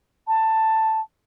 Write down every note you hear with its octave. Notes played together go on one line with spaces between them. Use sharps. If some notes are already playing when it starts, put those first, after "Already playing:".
A5